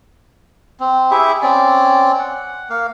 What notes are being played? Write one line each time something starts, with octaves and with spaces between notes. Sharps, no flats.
C4
E4 G4 G#4 E5
C4 C#4 D5
F#5
A#3 F5